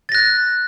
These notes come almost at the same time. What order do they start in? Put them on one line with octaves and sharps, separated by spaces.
A6 A#6 F#6